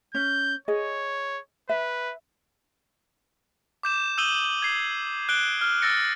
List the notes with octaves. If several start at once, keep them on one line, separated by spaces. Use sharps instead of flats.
C#4 G6
G#4 C#5 D#5
B4 E5
D6 G6 E7
D#6 E6 G6 D#7 F#7 G7
G#6 C7
F#6 D7 G7
F6
E6 F#6 A6 A#6 C#7 D7